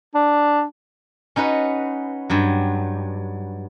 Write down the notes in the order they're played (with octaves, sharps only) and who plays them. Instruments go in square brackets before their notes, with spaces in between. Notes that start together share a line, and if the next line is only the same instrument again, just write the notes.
[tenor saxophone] D4
[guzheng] C#4 D#4 F#4 B4
G2 F#3